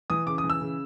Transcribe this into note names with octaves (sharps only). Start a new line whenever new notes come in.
E3 D#6
C#3 D6
D#6
E3
E6
C#3